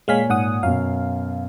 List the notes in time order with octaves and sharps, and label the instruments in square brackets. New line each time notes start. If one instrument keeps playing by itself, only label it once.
[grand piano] A#2 C#5 G#5 [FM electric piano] G#3 F5 B6
[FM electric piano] G#2 F#5 D#6
[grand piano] F#2 B2 [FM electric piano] F5